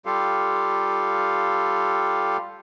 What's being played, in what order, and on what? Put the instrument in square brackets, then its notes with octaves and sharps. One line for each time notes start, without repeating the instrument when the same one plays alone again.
[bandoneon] G3 F4 G4 A4 F5